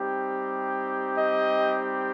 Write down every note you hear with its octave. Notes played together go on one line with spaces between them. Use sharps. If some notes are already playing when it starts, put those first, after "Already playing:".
Already playing: G3 C4 D#4 G4
D#5